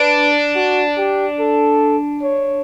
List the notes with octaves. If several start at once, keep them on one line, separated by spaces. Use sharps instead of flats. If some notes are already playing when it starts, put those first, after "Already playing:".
Already playing: D4 B4
F#4
G4
A4
C#5